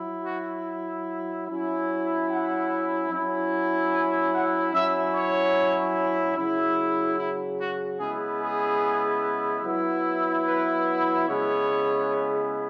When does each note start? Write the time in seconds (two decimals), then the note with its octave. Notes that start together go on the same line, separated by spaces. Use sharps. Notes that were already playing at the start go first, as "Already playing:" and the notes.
Already playing: F#3 E4
0.24 F#4
1.47 F#3 C#4 E4
2.29 F#5
3.10 F#3 C#4 E4
3.92 G#5
4.33 F#5
4.74 F#3 C#4 E4 E5
5.14 C#5
6.36 C#3 F#3 E4
7.18 E4
7.60 F#4
7.99 C#3 G#3 B3 E4 G#4
8.41 G#4
9.63 F#3 B3 E4
10.45 B4
11.27 C#3 G#3 B3 E4 C#5